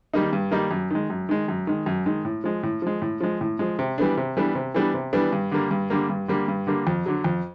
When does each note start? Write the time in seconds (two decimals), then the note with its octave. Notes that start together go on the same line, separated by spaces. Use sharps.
0.13 D#3 G3 A#3 D#4
0.33 G2
0.51 D#3 G3 A#3 D#4
0.71 F#2
0.90 D#3 G#3
1.10 F#2
1.29 D#3 G#3
1.48 F#2
1.67 D#3 G#3
1.86 F#2
2.06 D#3 G#3
2.25 A2
2.44 F3 G#3
2.63 A2
2.82 F3 G#3
3.02 A2
3.20 F3 G#3
3.41 A2
3.59 F3 G#3
3.79 C3
3.98 E3 G3 B3 D4
4.17 C3
4.37 E3 G3 B3 D4
4.55 C3
4.74 E3 G3 B3 D4
4.94 C3
5.13 E3 G3 B3 D4
5.32 G2
5.51 D3 G3 A#3
5.71 G2
5.90 D3 G3 A#3
6.09 G2
6.28 D3 G3 A#3
6.48 G2
6.67 D3 G3 A#3
6.87 F2
7.06 D3 F#3
7.24 F2